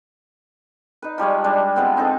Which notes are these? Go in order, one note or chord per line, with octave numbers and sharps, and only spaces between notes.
D#4 B4
F3 G3 G#3 C#5
G3 G#3 D4
F3 G#3 B3 C4
C4 D#4 A4